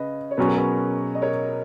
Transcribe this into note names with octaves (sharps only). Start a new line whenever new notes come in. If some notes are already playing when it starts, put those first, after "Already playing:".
Already playing: C#3 B4 D#5
C#5
B2 F#3 C#4 G#4 B4
F#4 A#4
G#4 B4
D#5
A#4 C#5